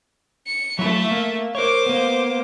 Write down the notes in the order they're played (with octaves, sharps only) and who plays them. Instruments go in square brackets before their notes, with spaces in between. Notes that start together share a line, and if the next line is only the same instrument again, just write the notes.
[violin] C#7
[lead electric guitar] F#3 E4 [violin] A3 E5
[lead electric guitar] A#3
[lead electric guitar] A#4 C#5 [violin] C5 D6
[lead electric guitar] A#3 B3